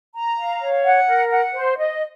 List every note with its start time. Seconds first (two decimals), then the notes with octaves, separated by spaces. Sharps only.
0.14 A#5
0.38 F5
0.61 C#5
0.85 F#5
1.07 A#4
1.31 F#5
1.55 C5
1.78 D#5